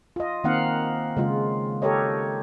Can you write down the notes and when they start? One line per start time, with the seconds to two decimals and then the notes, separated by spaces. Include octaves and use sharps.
0.16 F4 D#5
0.44 D#3 A#3 C4 D#4 F5 F#5
1.17 C#3 G#3 F4
1.82 G4 A4 A#4 C#5 D#5